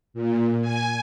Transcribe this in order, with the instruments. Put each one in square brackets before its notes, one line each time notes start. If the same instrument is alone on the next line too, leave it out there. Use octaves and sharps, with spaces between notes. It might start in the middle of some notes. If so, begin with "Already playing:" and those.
[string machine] A#2
G#5